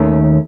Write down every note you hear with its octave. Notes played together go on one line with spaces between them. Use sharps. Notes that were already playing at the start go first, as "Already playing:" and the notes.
Already playing: D#2 D#3 A3 C#4